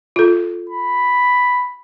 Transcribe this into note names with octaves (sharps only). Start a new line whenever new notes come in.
F4 A4
B5